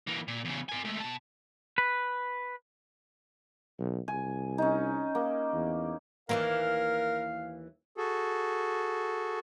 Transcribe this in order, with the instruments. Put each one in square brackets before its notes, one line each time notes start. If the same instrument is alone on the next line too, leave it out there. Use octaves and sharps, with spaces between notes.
[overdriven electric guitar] E3 A#3
A#2
E2 C#3
A#4 G#5
G#3 A3
B2 A5
[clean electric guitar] B4
[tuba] B1
[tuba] C2 [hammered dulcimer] G#5
[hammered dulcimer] C#4 D#4
A#3
[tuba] E2
[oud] D#2 E3 A#3 [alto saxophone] A#4 [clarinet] F5
[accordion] F#4 G#4 A4